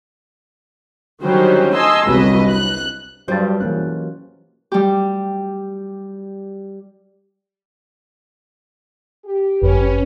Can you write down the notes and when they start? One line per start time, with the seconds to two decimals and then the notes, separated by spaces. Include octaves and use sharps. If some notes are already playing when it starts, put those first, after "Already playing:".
1.22 D3 D#3 F#3 G3 C#4 C5
1.75 D#5 G#5 A5 C6 E6
2.07 G1 C2 F#3 B4 D#5
2.48 F#6
3.28 G2 F#3 G3 F4 G4 C5 A6
3.60 F#2 B2 E3 G#3 A#3 C#4 F#6
4.72 G3 G4
9.24 G4
9.62 G1 F#2 C#4 B4